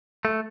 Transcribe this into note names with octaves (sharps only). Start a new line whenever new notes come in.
A3